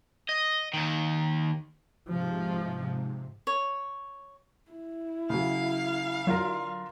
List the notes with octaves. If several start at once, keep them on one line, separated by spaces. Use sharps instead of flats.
D#5
D#2 D#3
G#2 C3 F3
C#5
E4
C#3 F#3 F5
D3 F#3 F4 A#4